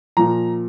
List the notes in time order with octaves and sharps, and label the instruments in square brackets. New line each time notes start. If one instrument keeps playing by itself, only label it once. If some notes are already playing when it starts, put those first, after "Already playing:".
[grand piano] A#2 F3 A#5